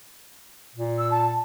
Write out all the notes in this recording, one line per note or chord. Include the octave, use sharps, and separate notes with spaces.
A#2
E6
A5